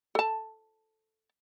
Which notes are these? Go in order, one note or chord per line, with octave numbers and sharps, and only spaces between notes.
A4 A5